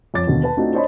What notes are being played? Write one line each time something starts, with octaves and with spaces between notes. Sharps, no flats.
F2 C#5 D6 A6
D#2 B2 D3
B4 A5
A3 C4 D4 D#4 F4 F#4
D4 C5 C#5 D#5 B5